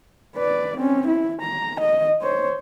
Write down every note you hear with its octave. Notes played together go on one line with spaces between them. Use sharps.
B4 D5
C4 C#4
E4
A#5
D#5
C5 C#5